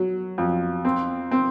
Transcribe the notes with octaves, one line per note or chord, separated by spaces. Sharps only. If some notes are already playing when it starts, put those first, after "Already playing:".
Already playing: F#3
F2
C4
C4